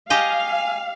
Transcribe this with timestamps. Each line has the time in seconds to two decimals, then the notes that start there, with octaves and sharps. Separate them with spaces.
0.10 G4 D#5 F5 G5 G#5